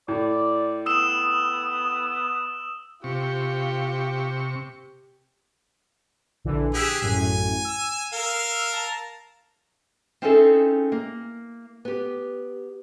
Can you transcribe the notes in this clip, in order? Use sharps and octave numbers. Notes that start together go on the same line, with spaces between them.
A2 D5
B3 D#6 E6 E7
C3 F4 G4 C#6
A#1 D3 E3
G4 G#4 E6 F#6 B6
A1 F#2 A2 G#5
E6
A#4 F5
A5 A#5
C4 C#4 D#4 E4 G#4 A4
A#3
B3 G4